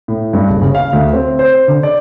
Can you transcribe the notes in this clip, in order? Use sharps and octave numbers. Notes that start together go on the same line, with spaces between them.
A2
G2
F#1
C#3
F5
D2
C4
C5
D3
D5